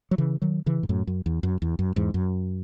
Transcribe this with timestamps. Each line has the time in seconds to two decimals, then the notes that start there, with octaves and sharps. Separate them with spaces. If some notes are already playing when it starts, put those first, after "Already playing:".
0.11 F#3
0.18 C#3 E3
0.42 D#3 F#3
0.66 C#3 E3
0.83 G#2
0.89 F#2 A2
1.07 F#2
1.26 E2
1.43 F#2
1.62 E2
1.79 F#2
1.96 E2 G#2
2.14 F#2